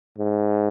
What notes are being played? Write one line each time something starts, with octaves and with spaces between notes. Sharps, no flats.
G#2